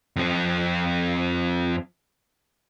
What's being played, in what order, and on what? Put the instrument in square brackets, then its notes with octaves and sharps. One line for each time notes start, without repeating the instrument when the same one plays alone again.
[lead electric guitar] F2 C4